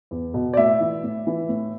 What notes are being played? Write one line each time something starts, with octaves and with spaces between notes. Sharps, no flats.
E2
B2
D5
A2 E5
E3
A2
E3
A2